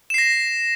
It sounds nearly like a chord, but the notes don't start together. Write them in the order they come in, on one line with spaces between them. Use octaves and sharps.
E7 C7 A#6